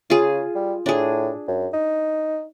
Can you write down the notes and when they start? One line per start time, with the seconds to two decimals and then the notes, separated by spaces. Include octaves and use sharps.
0.10 C#3 F4 G#4
0.55 G3
0.86 A2 D4 G#4
1.48 F#2
1.73 D#4